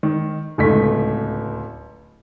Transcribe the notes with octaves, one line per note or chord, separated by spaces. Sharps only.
D#3
D1 C#2 A3 D#4 B6